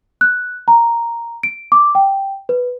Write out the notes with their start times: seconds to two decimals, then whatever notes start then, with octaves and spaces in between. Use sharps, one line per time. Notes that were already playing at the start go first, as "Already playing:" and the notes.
0.21 F#6
0.68 A#5
1.43 D7
1.72 D6
1.95 G5
2.49 B4